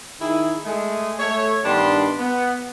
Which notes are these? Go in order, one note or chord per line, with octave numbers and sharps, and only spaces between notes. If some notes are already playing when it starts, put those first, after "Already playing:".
D#3 E4 G#4
G#3 A3 G#4
A3 C#5
G2 D#3 B3 D4 B5 C6
B3